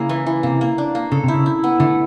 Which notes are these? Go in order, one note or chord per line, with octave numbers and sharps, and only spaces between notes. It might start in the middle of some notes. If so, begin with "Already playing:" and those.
Already playing: C#3 A#3 E4
E3
E3
C3 A#3
A#3
D4
A#3
C#3 A4
C3
E4
C#3
E4
B3
D3 A3